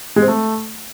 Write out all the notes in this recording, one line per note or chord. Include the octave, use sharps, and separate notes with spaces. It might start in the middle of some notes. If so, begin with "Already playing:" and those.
G#3
C4
A3